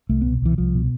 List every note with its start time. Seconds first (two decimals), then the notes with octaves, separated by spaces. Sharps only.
0.09 C2 A3
0.21 B2 B3
0.42 C2 E3
0.58 C2 F3
0.75 B2